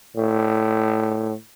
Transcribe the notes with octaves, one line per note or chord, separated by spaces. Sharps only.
A2